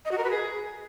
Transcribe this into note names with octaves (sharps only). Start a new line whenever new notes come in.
D#5
F#4
A#4
B4
G#4